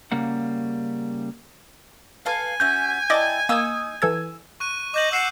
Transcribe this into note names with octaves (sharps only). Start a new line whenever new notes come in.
C#3 G3 A#3 F#5
A4 B4 F5 G#5
C#4 F#4 E5 G6
E4 D5 D#5 G5 A5 D6
A#3 D#4 D#6 E6 G#6
E3 A4 E6 G#6
C#6 F#6 D#7
D#5 D6 G6 F#7
F#5 E6 C7 E7